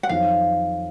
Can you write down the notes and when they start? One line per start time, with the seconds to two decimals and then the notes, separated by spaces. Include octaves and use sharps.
0.03 F#5
0.09 F2 D#3 F#3 F5